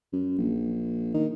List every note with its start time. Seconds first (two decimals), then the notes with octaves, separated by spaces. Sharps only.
0.13 F#2
0.38 A#1
1.14 D#3